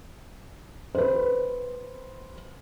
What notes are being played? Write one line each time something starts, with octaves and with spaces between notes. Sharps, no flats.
B4 C5